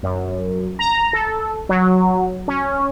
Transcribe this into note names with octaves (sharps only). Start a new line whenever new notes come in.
F#2
A#5
A4
F#3
C#4